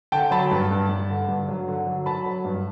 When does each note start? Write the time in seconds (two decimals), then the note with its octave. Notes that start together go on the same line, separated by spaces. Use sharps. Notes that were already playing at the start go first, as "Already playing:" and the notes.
0.12 D3 G5 A5
0.31 F#3 A5 B5
0.51 G2
0.71 G2
0.89 G2
1.10 D3
1.29 G2
1.49 F#3
1.68 D3
1.87 F#3
2.06 F#3 A5 B5
2.26 F#3
2.45 G2